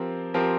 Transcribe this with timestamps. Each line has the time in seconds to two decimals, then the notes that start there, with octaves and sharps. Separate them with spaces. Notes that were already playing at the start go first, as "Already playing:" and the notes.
Already playing: F3 C4 G4 A#4
0.34 F3 C4 G4 A#4